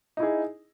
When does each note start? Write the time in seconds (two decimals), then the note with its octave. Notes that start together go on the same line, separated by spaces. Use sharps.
0.17 D#4
0.20 E4
0.23 G#4